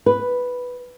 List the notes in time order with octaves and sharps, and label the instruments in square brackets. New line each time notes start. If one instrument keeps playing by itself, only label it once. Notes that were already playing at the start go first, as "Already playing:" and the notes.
[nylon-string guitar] B4